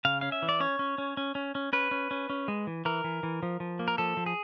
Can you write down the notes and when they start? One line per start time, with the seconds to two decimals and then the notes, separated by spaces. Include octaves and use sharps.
0.05 C#3 F5
0.21 C#4 F5
0.32 E5
0.42 E3
0.49 D5
0.60 C#4 C#5
0.79 C#4
0.98 C#4
1.17 C#4
1.35 C#4
1.55 C#4
1.73 C#4 B4
1.91 C#4
2.11 C#4
2.30 C#4
2.48 G#3
2.67 E3
2.85 E3 A#4
3.04 E3
3.23 E3
3.43 F3
3.60 F3
3.79 A#3
3.88 A#4
3.98 F3 A4
4.17 F3
4.26 G#4